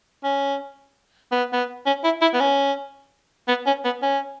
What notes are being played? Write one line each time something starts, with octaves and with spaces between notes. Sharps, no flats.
C#4
B3
B3
C#4
E4
E4
B3
C#4
B3
C#4
B3
C#4